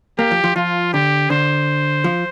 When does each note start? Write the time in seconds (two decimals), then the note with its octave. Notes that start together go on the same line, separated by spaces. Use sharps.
0.19 A#3 G4
0.31 F3
0.44 F3
0.56 F3 F4
0.93 D3 G4
1.30 D3 C5
2.04 F3